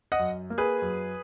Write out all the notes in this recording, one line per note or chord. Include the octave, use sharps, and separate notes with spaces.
D#5 F#5
F#2
A#3
G#4 B4
F#2